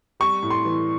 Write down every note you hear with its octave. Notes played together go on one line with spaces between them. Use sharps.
G3 C#6
A2
C6
E3